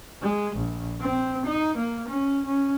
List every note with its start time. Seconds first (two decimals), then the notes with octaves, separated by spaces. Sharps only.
0.22 G#3
0.56 A#1
1.01 C4
1.45 D#4
1.77 A#3
2.08 C#4
2.46 C#4